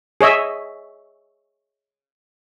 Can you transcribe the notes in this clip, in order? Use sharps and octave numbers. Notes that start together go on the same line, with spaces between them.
G#4 C#5 D#5 E5